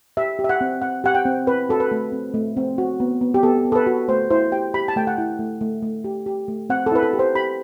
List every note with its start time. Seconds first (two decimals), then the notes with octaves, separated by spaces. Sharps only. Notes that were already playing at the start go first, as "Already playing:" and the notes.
0.17 G4 E5
0.39 G4
0.44 E5
0.49 F#5
0.61 C4
0.82 C4 F#5
1.04 G4 F#5
1.15 G5
1.26 C4
1.47 C4 B4
1.69 F#4 A4
1.80 B4
1.91 A3
2.12 C4
2.34 A3
2.57 C4
2.78 F#4
3.00 B3
3.21 B3
3.34 G4
3.43 B3 A4
3.65 B3
3.72 A4
3.76 B4
3.87 F#4
4.08 A3 C5
4.31 E4 C5
4.52 G4 G5
4.74 G4 B5
4.88 A5
4.96 A3 G5
5.07 F#5
5.18 E4
5.39 A3
5.61 A3
5.82 A3
6.04 G4
6.26 G4
6.48 A3
6.70 C4 F#5
6.86 A4
6.92 E4 B4
7.03 A4
7.13 G4
7.19 C5
7.35 G4 B5